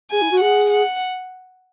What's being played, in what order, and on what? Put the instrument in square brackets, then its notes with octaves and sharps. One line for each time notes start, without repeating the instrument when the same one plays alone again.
[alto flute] G#4 [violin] G#5
[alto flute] E4
F#4
[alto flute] G#4 [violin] F#5
[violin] F#5